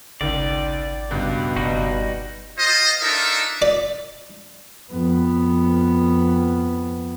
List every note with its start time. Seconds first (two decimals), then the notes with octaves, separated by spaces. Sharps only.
0.21 G#1 C#2 D#3 D5
1.11 C#2 G2 B2
1.57 F#1 G3 D#4 F#4
2.58 F4 C5 D#5
3.01 D4 D#4 F4 A4 A#4 E5
3.62 D5
4.92 F2 B3